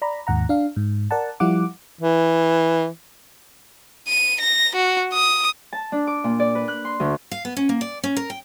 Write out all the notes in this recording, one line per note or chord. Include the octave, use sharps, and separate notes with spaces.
D5 A#5 B5
D#2 G#2 F#5 A#5
D4 F5
G#2
A#4 D5 F#5 A5
F3 G3 E4 F4 F#5 D6
E3
D#7
A#6
F#4
D#6
A5
D4
D6
A#2
D5
B4
F#6
C6
D2
F5
B3
C#4
A#3
D5
C#4
A#4
G5